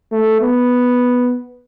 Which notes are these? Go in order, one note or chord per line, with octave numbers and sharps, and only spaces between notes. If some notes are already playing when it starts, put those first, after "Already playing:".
A3
B3